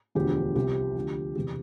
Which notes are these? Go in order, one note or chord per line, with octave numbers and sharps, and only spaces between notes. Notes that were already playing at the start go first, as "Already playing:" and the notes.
E1 D2 D3 F3 G4
C2 C3 F3 G4
D2 D3 F3
E1 E2 C3 G4